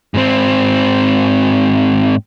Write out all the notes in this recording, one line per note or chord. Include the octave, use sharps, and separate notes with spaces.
G#2 C4